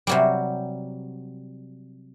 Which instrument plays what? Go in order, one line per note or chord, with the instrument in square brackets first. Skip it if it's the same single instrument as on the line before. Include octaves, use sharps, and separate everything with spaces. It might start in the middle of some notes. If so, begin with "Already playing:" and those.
[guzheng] C3 F#3 G3